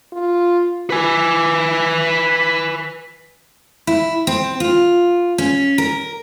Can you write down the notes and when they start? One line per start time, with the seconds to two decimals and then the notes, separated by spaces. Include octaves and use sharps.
0.13 F4
0.90 B4 G#5
3.87 E4
4.27 C4
4.60 F4
5.38 C#4
5.78 A#4